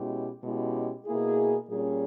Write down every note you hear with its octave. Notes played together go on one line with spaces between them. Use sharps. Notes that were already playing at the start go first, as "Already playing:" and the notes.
Already playing: B2 G#3 C#4 E4 G4
B2 G#3 C#4 E4 G4
B2 A#3 E4 G#4
A#2 G3 C#4 G#4